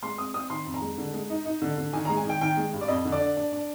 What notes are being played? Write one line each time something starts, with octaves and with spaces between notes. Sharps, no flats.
G#3 C6
C4 D#6
C4 D#6
D#3 C6
F2
A#5
G#3
D3
G#3
D#4
D#4
D3
D3
D#3 G#5
G#3 A#5
G#5
D#3 G5
D#3 G5
G#3
G2
D5
F2 D#5
D3
D5
D4
D4
D4